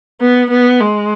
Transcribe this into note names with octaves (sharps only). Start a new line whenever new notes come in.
B3
B3
G#3